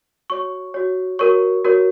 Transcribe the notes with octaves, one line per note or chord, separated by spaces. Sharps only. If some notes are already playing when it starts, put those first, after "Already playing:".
F#4 C#5 C#6
F#4 C#5
F#4 A#4 C#5 C#6
F#4 A#4 C#5